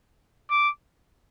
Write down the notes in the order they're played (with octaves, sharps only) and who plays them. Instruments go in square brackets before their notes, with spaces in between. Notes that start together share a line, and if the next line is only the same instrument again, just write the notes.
[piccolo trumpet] D6